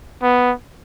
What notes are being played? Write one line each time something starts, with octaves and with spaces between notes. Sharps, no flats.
B3